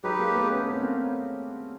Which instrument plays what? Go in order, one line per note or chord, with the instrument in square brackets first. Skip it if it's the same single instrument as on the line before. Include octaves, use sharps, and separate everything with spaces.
[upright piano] F#3 G#3 [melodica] D#4 G4 B4
[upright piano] G#3 A#3
A3 B3
B3 C#4
C4
C#4
A#3 C4